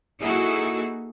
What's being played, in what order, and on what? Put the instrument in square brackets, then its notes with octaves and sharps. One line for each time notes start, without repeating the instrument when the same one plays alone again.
[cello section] A#3 D#4 E4 F#4 G#4 A4